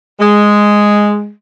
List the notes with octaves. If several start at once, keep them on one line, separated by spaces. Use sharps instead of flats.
G#3